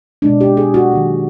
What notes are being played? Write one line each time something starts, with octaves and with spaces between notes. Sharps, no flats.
B2 G#3 D4
G4
G#4
F#4
D#3 F#3 A#3